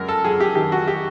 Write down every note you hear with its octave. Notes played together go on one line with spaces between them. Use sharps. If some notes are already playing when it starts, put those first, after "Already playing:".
Already playing: F#2 G#3 A#4
A4
F#2 G#4
G4
D#3 G4
F#4
G4